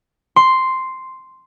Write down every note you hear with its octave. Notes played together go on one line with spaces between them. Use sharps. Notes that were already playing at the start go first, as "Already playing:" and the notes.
C6